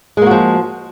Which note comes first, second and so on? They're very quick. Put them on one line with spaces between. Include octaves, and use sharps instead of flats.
G#3 A#3 F#4 F3